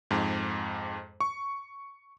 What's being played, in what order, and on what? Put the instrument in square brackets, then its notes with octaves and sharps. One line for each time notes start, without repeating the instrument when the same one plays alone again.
[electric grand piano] F2 G#2
C#6